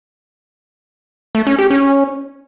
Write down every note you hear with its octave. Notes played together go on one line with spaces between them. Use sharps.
A3
C#4
G4
C#4